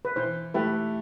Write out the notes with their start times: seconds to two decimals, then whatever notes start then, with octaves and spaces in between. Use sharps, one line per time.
0.05 B4
0.16 E3 C5
0.54 A3 E4 G4 B4